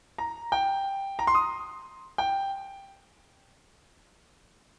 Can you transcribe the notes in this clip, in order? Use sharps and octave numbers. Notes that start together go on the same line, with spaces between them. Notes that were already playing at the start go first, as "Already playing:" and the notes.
A#5
G5
A#5
C6
D#6
G5